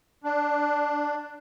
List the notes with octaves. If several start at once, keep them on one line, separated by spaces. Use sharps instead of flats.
D4